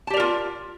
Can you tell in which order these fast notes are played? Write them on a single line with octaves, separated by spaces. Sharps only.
A5 G4 D5 A#4 F4